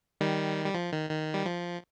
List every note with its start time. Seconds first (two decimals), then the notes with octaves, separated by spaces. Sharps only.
0.21 D#3 G3
0.66 G3
0.74 F3
0.93 D#3
1.11 D#3
1.34 G3
1.46 F3